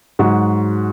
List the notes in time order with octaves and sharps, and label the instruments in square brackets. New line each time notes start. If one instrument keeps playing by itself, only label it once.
[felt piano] G#2 F#3 F#4